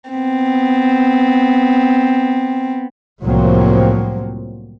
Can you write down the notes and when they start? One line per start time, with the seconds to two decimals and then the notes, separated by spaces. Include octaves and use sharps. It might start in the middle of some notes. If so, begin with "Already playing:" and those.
0.11 B3 C4
3.23 C2 A2 F3 F#3 A#3 C4